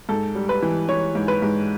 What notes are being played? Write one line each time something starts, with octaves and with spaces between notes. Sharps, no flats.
G#2 A4
G3
B4
E3
E3 C#5
G#2
B4
G#2